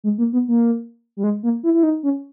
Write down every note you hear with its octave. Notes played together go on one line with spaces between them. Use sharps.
G#3
A#3
B3
A#3
G3
G#3
A#3
E4
E4
D#4
C#4